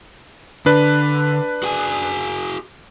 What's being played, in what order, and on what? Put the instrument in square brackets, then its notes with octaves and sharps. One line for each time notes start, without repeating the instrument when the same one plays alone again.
[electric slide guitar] D3 [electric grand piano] D4 B4
[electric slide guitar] F#4 G#4 G#5